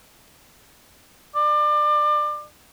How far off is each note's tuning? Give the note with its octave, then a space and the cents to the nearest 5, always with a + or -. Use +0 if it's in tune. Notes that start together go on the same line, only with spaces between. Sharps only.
D5 +30